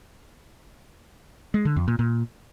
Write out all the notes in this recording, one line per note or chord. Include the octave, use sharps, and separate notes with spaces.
G#3
D3
F2
A#2
A#2